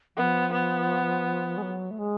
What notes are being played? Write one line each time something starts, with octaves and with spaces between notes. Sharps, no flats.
F3 B3
B3
G#3
F#3
A3
G#3